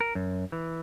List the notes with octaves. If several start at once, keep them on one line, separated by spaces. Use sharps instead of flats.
A#4
F#2
E3